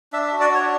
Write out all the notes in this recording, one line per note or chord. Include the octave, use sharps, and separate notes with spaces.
D4 E5
E5
F#4
D5
D4 C#5